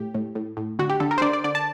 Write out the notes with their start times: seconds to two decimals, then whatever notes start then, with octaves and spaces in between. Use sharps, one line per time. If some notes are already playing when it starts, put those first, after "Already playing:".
Already playing: A2 G4
0.14 A2
0.35 A2
0.57 A2
0.79 D3 F#4
0.90 G4
1.00 D3 A4
1.11 A#4
1.18 C5
1.22 D3 D5
1.33 D5
1.44 D3 D5
1.55 A5